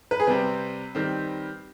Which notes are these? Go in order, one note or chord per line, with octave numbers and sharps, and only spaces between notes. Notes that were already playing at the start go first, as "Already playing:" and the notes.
B4
G#4
C3 G3 C4 B4
D#3 G3 C4